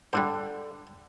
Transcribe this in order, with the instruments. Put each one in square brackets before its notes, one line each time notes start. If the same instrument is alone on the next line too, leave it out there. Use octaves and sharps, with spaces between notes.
[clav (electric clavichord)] D3 [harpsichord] G3 D4 C5